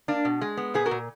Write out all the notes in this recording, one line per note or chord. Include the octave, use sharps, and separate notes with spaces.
A#3 D4
B2
G#3
B3
A#2 G#4 B4
F#4 A#4
A#2